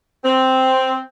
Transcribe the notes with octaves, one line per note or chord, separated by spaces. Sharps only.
C4